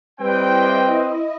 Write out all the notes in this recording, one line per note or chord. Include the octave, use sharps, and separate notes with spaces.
G3 C4 E4 B4 D#5 G5